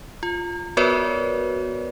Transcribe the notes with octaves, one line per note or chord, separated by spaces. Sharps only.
F4
B3 F#4 A#4 B4 C#5 D5